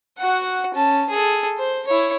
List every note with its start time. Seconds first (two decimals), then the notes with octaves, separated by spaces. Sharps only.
0.18 F#4 F#5
0.75 C#4 A5
1.09 G#4 A4
1.58 C5
1.87 E4 C#5